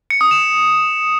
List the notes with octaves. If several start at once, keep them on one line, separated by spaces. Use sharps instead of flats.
C#7
D#6
E7